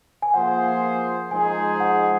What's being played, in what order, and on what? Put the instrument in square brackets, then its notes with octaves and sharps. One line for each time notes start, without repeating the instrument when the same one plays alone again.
[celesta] G#5
[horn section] F3 A#3 F4 G#4 C5 [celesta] F#5
[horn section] F3 G#3 D#4 G#4 C5 [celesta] G#5
[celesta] F#5